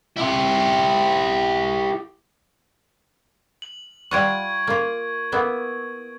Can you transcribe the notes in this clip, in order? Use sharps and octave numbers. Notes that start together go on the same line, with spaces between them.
E4 G4
F#7
G3 F4 F#5 C#6 G#6 D7
A#3 F4
A#3 B3 E4